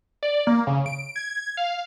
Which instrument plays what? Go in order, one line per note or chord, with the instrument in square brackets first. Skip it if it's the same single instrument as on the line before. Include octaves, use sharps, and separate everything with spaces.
[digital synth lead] D5
A#3
C#3
D7
G#6
F5